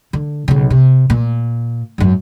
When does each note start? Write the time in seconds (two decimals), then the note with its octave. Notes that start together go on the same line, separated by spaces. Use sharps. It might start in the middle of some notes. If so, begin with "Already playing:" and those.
0.13 D3
0.48 B1 C#3
0.70 C3
1.10 A#2
1.98 G#1 F#2